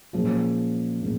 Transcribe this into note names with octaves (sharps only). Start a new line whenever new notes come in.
A#2 F3 G#3 C#4 G#4
A#2 G#3